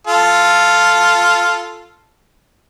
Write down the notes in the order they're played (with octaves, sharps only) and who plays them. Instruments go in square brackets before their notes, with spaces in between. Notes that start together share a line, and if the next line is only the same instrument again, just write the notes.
[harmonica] F4 A4